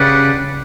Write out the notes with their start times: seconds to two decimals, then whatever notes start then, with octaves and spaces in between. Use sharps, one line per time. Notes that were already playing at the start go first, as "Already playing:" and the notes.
Already playing: C#3 D4 G4 B4 D5 F#5